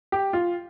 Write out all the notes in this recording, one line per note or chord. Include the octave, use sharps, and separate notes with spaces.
G4
F4